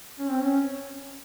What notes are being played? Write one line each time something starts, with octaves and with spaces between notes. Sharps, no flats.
C#4
C4
C#4